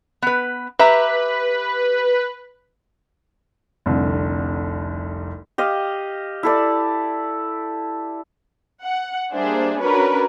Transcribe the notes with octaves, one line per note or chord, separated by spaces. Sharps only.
B3 B4
G4 B4 E5 A#5
F1 C2 D3
G4 D#5 F5
E4 A4 D5
F#5
G3 A#3 D4 G#4 C5 E5
C#4 D4 F#4 A#4 B4 C#5